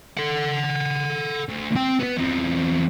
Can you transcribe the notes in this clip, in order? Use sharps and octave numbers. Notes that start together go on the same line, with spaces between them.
A4 F#5
D2
C4 G5
B3 B4
E2 C4